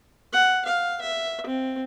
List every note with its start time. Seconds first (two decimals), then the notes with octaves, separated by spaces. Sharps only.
0.33 F#5
0.65 F5
1.01 E5
1.46 C4